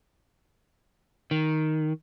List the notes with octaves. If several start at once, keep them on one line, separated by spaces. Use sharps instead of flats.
D#3